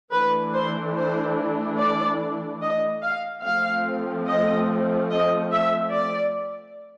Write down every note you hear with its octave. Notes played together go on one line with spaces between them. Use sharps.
E3 A3 D4 B4
C5
C5
D5
D#5
F5
F3 A3 C4 F5
D#5
D#5
E5
D5